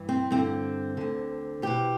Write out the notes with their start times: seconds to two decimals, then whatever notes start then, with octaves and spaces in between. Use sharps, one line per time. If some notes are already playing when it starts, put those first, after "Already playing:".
Already playing: G2 E3
0.09 C4
0.31 G2 D3 C4
0.97 D2 D3
1.62 E2 B2 G4